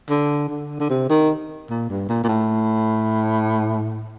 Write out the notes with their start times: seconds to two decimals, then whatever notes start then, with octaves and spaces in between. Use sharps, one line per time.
0.10 D3
0.49 D3
0.80 D3
0.90 C3
1.10 D#3
1.70 A#2
1.90 G2
2.09 A#2
2.24 A#2
2.29 A2